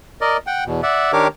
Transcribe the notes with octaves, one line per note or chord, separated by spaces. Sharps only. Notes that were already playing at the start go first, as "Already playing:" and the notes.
A#4 D5 D#5
F#5 G5
E2 B2
D5 E5 F#5
D#3 D4 G4 A#4 C#5 D6